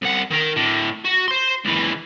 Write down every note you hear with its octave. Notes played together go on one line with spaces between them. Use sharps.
C2 F#5
D#3 A#4
A2 D3
F#4
C5 C6
C#2 E3